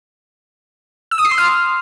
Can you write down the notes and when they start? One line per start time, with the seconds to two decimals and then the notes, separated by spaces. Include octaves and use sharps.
1.11 E6
1.18 D#6
1.25 C7
1.31 C6
1.38 F6